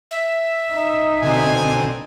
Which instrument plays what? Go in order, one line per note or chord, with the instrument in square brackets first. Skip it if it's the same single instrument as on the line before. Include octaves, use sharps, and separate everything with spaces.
[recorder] E5
[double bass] D#4
[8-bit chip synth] B2 D3 C4 [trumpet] G#5